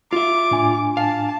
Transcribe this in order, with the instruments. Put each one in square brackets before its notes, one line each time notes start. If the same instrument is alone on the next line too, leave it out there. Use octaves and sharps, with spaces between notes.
[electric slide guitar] F4 E5 [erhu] D6
[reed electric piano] A2 D4 G#5
[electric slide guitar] F5 [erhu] A5